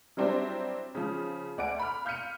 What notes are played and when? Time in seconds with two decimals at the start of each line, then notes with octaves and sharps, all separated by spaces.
0.17 F#3 G3 C4 D4 E4 C5
0.95 C#3 F3
1.58 D2 D5 F#5 G#5 D7
1.80 B5 F6
2.05 F5 F6 G6 B6 C#7 D#7